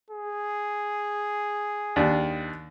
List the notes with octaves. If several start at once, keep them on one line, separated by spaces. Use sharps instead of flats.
G#4
D#2 D4